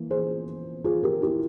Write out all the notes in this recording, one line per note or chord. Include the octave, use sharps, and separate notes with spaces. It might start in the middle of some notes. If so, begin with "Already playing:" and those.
Already playing: E3 A#3
G#4 C5
F4 G#4
G4 A#4
E4 G4